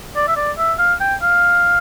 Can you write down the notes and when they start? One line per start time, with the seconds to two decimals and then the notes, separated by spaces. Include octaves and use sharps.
0.16 D5
0.28 E5
0.36 D5
0.58 E5
0.79 F5
1.00 G5
1.22 F5